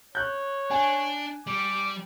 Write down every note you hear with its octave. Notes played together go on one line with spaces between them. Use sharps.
C#5 F#6 G6
D4 G#5
G3 D6